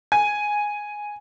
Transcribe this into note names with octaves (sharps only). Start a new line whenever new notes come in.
G#5